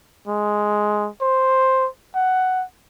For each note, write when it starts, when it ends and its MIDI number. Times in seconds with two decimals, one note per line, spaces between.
0.27 1.09 56
1.21 1.88 72
2.15 2.64 78